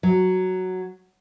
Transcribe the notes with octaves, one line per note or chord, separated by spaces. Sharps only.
F#3